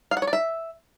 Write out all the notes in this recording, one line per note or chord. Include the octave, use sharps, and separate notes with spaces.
F5
F#5
C#5
D5
E5